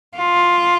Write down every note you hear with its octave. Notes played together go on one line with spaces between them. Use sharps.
F4